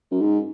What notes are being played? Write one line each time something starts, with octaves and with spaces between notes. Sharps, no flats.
F#2
G#2